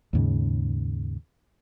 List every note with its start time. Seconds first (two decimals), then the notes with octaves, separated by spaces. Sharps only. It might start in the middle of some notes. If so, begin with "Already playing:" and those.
0.13 D#2 G#2 C#3